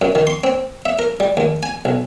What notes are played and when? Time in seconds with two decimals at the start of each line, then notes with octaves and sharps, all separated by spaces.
0.02 F#2
0.15 D#3
0.27 C6
0.44 C4
0.86 E5
0.99 A#4
1.20 G3
1.37 D#2
1.63 G#5
1.85 B1